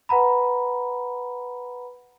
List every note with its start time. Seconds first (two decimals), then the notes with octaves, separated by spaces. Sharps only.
0.09 B4 F#5 A#5 B5